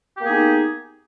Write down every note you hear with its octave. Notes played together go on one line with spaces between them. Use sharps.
A#3 B3 D#4 G4 G#4